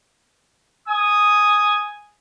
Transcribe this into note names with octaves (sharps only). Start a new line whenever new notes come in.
G#5 D#6